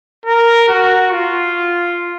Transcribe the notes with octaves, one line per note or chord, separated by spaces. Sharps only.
A#4
F#4
F4